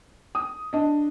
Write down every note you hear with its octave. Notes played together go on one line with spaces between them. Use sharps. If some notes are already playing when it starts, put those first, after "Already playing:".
D#6
D4 D#5